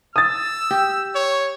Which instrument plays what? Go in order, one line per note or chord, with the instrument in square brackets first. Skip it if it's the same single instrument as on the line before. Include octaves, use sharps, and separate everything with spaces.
[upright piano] D#6 A6 [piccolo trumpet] E6
[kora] G4
[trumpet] C#5